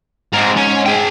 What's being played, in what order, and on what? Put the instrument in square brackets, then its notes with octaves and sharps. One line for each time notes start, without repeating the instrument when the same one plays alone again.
[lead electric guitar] G#2 [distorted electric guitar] C4 A#4
[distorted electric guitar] C#4
G#4 G5